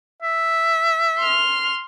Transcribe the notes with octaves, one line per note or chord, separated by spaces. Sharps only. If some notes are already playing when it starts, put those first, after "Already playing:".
E5
C6 F6